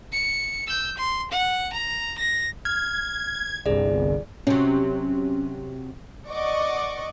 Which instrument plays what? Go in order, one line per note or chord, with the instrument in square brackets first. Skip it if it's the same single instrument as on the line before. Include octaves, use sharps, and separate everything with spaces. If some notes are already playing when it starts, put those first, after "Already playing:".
[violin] C#7
E6 G6
C6
F#5
A#5
A#6
[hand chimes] F6 [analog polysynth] G#6
[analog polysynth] G1 C2 [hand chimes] G#4 D5
[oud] C3 F#3 [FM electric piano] C#4
[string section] D5 D#5 F#5 C#6 D6